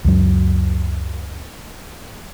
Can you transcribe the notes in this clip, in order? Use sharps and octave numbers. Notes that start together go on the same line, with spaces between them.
C#2 F#2 F#3